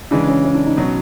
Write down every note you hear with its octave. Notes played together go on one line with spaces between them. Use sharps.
C#3 E3 G#3 D4
C#4
C#4
D4
D#4
B2 F#3 C#4